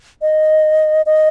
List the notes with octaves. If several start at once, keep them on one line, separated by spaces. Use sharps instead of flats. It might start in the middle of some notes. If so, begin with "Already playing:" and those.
D#5
D#5